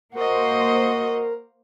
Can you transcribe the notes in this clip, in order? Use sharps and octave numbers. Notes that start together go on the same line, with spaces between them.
A#3 F#4 A#4 C5 D#5